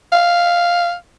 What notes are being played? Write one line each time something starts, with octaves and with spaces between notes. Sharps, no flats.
F5